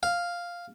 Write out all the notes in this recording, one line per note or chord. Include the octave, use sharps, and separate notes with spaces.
F5